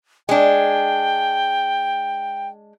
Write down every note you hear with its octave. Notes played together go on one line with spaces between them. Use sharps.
G#3 D4 G5